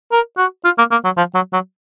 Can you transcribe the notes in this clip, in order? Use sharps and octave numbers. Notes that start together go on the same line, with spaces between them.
A#4
F#4
F4
A#3
A#3
F#3
F3
F#3
F#3